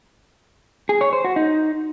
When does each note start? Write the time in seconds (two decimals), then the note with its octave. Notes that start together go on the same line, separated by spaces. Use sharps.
0.89 G#4
1.01 C#5
1.13 C5
1.25 F#4
1.36 D#4